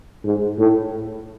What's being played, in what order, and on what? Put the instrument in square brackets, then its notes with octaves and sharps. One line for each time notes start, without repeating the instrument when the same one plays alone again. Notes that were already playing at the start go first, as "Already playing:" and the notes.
[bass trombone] G#2
A2